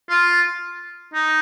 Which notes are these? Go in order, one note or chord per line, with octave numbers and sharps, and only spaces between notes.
F4
D#4